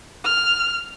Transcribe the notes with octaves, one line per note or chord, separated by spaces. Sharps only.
F6